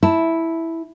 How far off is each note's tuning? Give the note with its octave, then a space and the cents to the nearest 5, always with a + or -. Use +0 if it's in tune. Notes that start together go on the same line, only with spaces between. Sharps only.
E4 -5 A5 +5